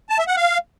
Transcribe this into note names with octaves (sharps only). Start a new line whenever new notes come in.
A5
E5
F#5
F5